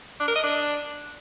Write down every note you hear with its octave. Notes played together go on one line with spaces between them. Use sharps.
D4
A#4
D#5
D4